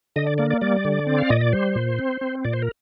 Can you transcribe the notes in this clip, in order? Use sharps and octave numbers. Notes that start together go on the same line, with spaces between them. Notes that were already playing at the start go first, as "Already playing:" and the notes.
D3 D#5
D5
A#3 D5
D5
G3 D5
D3
C4
F5
A#2 D#5
D5
G3 C5
A#2
C4
C4
A#2 D5
C5
A#4